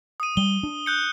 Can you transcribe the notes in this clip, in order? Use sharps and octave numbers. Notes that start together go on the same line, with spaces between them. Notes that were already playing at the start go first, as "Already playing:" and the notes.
D#6 D#7
G3 G7
D4
F#6 G6 C#7